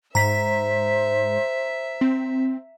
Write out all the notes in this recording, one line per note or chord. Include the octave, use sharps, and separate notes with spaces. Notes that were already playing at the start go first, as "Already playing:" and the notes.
G#2 C5 E5 A#5 B6
C4